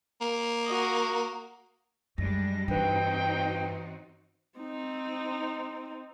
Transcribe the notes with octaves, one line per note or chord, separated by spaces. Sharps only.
A#3
F#4 D#5
F#2 G3 G#3 D4 A#6
G2 E3 C4 D#4 F#4 B4 G5
C4 D#4